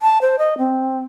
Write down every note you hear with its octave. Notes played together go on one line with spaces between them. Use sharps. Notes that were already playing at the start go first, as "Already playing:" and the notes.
A5
C5
D#5
C4